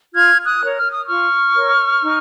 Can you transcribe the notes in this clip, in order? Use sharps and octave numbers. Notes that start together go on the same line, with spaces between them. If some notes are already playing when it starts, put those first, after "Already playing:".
F4 F6 G#6
D#6 F#6
A#4 C#5
F6
D#6
F4 C#6 F6
A#4 C#5
D#4